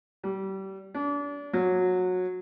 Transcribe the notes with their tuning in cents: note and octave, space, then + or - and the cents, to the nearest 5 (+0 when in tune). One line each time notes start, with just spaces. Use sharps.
G3 -30
D4 -35
F#3 -20